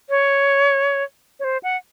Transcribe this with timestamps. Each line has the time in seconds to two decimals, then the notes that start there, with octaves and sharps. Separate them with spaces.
0.09 C#5
1.40 C#5
1.44 C5
1.63 F#5